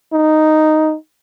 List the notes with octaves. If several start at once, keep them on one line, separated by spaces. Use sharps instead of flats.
D#4